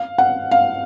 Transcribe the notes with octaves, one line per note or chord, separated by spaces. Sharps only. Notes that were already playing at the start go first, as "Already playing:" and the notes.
Already playing: F5
F#5
F5